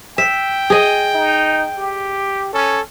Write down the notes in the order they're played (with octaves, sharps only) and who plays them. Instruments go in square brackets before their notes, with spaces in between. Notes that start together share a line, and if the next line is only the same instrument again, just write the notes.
[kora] E5 [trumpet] G5
[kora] G#4 D#5
[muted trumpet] D#4
G4
[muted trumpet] C#4 [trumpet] A4